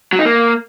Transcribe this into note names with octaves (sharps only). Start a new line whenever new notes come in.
F#3
D#4
A#3